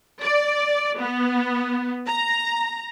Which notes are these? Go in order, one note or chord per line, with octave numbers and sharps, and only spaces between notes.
D5
B3
A#5